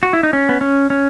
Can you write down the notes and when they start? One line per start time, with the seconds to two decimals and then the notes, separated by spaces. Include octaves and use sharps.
0.03 F#4
0.13 E4
0.23 D#4
0.33 C#4
0.49 B3
0.61 C#4
0.90 C#4